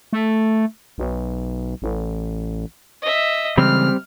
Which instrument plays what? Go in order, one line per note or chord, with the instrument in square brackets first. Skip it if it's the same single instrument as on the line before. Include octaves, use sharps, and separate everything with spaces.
[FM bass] A3
B1
A1
[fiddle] D#5 E5
[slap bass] C#3 E3 G#3 [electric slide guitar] G3 C4 [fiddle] F6